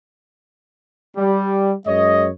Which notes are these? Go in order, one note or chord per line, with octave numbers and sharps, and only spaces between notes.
G3
F#2 G#3 C#5 D#5